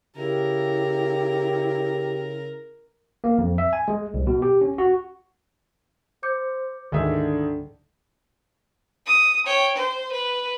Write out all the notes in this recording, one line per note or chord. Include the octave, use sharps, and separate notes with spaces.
C#3 E4 G4 A#4
A#3
F2
E5
G#5
G#3
C2
B2
G4
C#4
F#4
C5 D6 G6 C#7
D2 G#2 D3 D#3 G#4 D#5 E5
D#6
C#5 G5
C5
B4